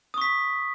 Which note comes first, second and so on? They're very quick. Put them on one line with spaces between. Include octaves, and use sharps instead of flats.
D#6 C#6 B6